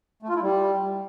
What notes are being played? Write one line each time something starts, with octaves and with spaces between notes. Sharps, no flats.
A3
F4
E4
G3